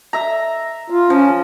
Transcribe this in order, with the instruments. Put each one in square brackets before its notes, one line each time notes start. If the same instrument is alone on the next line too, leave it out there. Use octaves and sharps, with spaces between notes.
[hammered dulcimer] E5 A#5
[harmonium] F4
[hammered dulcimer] F3 [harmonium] C#4